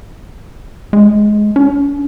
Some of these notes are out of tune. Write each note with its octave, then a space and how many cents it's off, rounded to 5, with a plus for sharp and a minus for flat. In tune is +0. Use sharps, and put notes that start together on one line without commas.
G#3 +15
C#4 +45